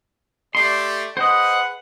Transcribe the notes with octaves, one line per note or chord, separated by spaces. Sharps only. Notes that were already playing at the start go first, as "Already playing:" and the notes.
A3 G4 D5 C6
G#4 B4 C5 D#5 F#5